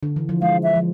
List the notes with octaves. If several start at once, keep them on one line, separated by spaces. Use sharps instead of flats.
D3
E3
F3
G#3 F5
E5
F3